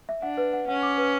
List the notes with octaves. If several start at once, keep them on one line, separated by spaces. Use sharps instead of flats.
E5
D4 F#5
B4
F#5
C#4 F#5
D6
B4